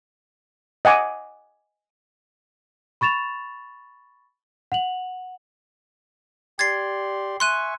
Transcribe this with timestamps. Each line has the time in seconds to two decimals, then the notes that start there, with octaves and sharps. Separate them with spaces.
0.85 D#5 F#5 G#5 D6
3.01 B5 C#6 A6 E7 F7
4.72 F#5 F7 F#7
6.59 G4 D5 C6 G#6 A6 C7
7.40 E5 G#5 C6 C#6 F#6 D#7